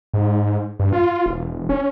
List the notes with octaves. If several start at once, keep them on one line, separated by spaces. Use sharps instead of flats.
G#2
G2
F4
E1
C#4